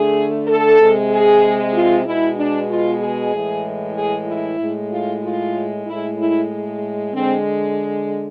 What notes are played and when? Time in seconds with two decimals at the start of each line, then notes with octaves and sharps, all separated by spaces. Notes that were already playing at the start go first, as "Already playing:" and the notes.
Already playing: D3 A3 G#4
0.48 A4
0.80 C3 G#3
1.11 G#4
1.74 F4
2.06 B2 G#3 E4
2.38 D4
2.70 F4
3.00 G#4
3.33 A2 E3 G#3
3.96 G#4
4.28 E4
4.59 A2 G#3
4.91 F4
5.23 F4
5.86 A2 G#3 E4
6.18 E4
7.12 D3 G#3 C4